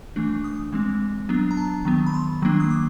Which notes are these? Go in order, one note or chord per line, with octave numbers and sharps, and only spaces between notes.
E3 A3 D4
D#6
E3 G#3 C4
F#3 B3 D4
A#5
A5
D#3 F#3 B3
B5
C6
D#3 F#3 A#3 D4
D#6
D6